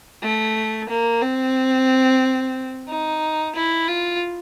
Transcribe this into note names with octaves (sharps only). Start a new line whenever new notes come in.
A3
A#3
C4
D#4
E4
F4